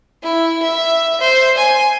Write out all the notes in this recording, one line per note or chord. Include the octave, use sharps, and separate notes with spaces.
E4
E5
C5
G#5